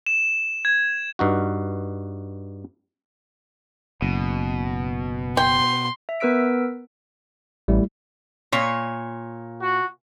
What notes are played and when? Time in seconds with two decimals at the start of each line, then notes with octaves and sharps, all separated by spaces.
0.07 E7
0.65 G#6
1.19 G2 D#4 F#4
4.02 F#1 B2
5.37 G5 C6
6.09 E5
6.20 B3 A#4 B4 E6 B6 D7
7.68 A1 G3 A3 E4
8.52 A#2 C#5
9.61 F#4